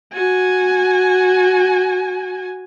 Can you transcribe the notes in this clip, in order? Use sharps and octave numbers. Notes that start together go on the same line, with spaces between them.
F#4 G#5